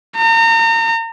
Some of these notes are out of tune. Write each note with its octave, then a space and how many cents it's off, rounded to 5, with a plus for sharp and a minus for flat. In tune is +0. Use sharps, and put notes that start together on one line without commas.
A#5 -35